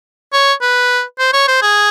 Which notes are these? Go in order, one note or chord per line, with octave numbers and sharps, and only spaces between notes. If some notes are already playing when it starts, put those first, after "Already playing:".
C#5
B4
C5
C#5
C5
G#4